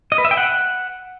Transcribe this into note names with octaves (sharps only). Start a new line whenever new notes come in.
D#5
B4
E5
G5
F#5